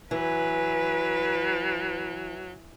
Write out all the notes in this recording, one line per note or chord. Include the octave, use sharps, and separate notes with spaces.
E3 F#3 B4